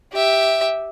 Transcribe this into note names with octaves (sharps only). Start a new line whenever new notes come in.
G4 E5